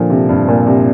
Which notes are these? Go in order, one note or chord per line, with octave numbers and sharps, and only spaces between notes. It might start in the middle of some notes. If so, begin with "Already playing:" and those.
Already playing: A#2 D3 F3
C3
G2
A#2
C3